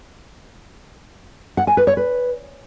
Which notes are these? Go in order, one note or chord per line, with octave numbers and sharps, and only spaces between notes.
F#5
G#5
B4
C#5
B4